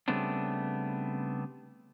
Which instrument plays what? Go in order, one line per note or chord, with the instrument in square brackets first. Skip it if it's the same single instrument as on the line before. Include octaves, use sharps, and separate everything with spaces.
[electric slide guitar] C#3 G3 A3 B3 C4 D4